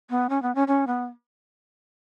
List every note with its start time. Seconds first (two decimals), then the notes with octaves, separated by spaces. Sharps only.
0.10 B3
0.29 C#4
0.42 B3
0.55 C#4
0.67 C#4
0.87 B3